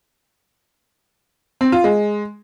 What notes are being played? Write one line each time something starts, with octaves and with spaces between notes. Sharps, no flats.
C4
F4
G#3